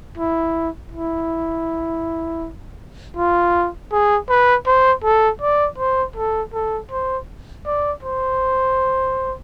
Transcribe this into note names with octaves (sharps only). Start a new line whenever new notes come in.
E4
E4
F4
G#4
B4
C5
A4
D5
C5
A4
A4
C5
D5
C5